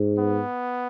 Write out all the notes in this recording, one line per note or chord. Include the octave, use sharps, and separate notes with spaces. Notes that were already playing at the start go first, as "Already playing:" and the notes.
Already playing: G#2
B3